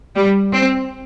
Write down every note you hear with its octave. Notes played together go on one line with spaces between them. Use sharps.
G3
C4